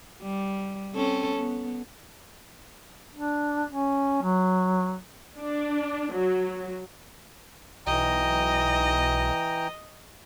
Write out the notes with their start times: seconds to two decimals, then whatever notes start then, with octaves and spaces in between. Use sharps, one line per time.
0.22 G3
0.94 C4 C#4 A4
1.37 B3
3.14 D4
3.70 C#4
4.23 F#3
5.37 D4
6.12 F#3
7.87 B1 E3 D#5 G5 A#5